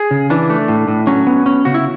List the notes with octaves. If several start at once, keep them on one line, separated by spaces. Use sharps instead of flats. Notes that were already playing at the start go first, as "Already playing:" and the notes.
Already playing: G#4
C#3
E3 D4
A3
A2
A2
F#3 C#4
B3
C#4
C#3 F#4
E4